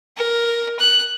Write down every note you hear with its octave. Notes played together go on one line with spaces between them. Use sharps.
A#4
F#6